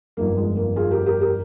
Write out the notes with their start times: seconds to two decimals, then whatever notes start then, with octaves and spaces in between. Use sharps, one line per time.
0.17 G1 F2 D#3 A#3
0.37 G#3
0.57 A#3
0.76 F4 G#4
0.91 G4 A#4
1.06 G4 A#4
1.21 G4 A#4